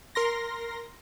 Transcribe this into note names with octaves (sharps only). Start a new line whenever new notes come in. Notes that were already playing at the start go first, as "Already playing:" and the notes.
A#4 C6 A#6